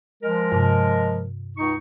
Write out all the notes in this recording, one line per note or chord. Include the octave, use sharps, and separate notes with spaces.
F3 G#3 A#4
G2 C3
C#2 D#4 C#6